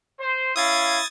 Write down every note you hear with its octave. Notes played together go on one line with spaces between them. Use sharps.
C5
C#4 E4 F5 D#6 G#6 A6